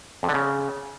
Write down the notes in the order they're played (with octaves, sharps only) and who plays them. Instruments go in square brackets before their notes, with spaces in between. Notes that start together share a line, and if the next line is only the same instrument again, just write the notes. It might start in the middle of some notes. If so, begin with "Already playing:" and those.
[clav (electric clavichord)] F2
D3
C#3